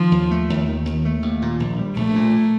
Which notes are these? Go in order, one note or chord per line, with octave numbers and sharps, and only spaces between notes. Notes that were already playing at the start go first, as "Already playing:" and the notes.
Already playing: D#3 F3
D#2
A3
D#2
D#3
D#2
A3
D#2
A#2
A#1
G3
A#1 A3
A#2